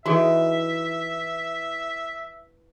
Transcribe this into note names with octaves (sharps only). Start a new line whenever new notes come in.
E3 D#4 F#4 G#4 A4 E5